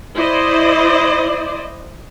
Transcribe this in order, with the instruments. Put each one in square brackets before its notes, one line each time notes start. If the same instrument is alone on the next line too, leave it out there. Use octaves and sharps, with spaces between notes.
[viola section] E4 C5 D5 D#5